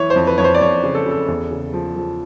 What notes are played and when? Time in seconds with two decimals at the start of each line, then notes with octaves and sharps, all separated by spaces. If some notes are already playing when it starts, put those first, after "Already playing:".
Already playing: E3 C#5
0.10 C5
0.16 F2
0.27 B4
0.38 F2 C#5
0.44 C5
0.54 D5
0.61 F2 C#5
0.83 C#3
0.95 A4
1.06 C#3 A4
1.28 E2
1.51 C#3
1.73 F3
1.96 F3